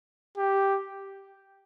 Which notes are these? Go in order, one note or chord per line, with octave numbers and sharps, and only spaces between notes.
G4